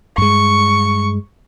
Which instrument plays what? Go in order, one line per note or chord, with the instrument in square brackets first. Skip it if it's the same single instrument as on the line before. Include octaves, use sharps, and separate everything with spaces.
[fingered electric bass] G2 G#3 [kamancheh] C#6